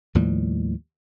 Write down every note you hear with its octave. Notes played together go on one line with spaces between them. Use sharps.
D#2 A2 F3 G3